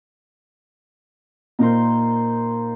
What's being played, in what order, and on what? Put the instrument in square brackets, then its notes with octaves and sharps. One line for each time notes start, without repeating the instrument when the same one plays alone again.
[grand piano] A#2 [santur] D#4 A#4 C5